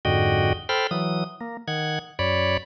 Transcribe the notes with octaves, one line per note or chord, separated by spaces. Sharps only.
F2 G#2 D3 F#4 D#5 G5
A4 C5 G5 B5 F6
E3 F#3 D#6
A#3
D#3 F#5 G#6
F#2 C#5 D5 B5